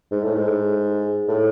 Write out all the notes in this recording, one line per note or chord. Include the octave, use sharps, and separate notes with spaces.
G#2
A2
G#2
A2